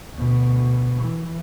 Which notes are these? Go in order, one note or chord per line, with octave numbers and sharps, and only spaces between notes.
D2 B2
E3